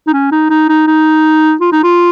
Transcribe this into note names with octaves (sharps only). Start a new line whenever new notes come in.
D#4
C#4
D#4
D#4
D#4
D#4
F4
D#4
F4